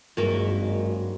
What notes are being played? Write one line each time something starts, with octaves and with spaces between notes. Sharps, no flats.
G#1 G2 F#3 G#3 A#3 A#4 E5